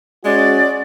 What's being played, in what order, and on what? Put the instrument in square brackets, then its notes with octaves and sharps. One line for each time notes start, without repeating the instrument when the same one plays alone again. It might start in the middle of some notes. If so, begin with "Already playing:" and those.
[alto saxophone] G#3 [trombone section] C#4 F#4 [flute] D5